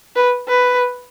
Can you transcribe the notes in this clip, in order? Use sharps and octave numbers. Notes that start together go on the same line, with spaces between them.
B4
B4